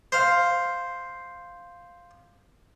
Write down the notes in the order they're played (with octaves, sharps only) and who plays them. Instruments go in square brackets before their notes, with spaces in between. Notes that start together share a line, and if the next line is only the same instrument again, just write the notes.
[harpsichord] C5 F5